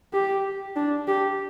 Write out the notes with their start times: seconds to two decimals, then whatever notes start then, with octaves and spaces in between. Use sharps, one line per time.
0.13 G4
0.76 D4
1.08 G4